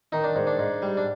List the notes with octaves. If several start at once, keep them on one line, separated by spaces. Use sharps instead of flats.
D#3 D#4
D4
G#2
D4
G#2
G3
D4